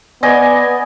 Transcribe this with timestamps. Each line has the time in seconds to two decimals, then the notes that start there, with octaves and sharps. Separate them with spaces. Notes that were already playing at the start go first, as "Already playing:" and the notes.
0.23 B3 D5 D#5 G#5